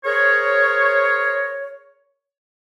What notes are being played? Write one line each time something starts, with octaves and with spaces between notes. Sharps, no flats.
G#4 A#4 C5 C#5